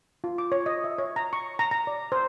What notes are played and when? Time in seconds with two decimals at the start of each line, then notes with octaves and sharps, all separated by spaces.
0.24 F4
0.38 D6
0.52 C#5
0.66 D#5
0.84 E5
0.98 C#5
1.16 A#5
1.33 C#6
1.59 A#5
1.71 A#5
1.87 D5
2.12 C5